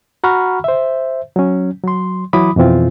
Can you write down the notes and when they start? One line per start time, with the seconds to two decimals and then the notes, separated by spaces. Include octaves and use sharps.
0.24 F#4 F#5 A#5 B5 C#6 F6
0.64 C5 E5
1.36 F#3 C#4
1.83 F#3 C6
2.33 E3 F#3 E4 B5 D6 D#6
2.56 F2 B2 E3 C4 F4